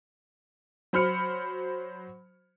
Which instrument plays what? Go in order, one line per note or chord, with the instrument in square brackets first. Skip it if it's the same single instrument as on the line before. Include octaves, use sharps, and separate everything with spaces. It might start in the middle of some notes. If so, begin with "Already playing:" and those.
[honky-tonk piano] F#3 C5 B5 F6 C#7